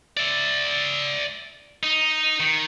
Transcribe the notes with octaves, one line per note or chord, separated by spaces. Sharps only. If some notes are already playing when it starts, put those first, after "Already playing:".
D5 E5
D#4
D#3